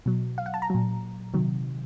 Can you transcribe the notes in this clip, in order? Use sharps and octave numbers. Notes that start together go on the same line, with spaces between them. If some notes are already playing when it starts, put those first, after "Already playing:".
B2 F#3
F5
F#5
A5
A#5
A#2 F#3
C3 D#3 F#3